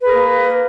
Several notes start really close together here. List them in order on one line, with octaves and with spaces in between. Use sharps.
B4 G#4 A#4 A#3